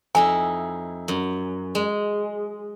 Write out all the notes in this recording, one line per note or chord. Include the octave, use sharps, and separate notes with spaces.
F2 D#4 E4 G#5
F#2
G#3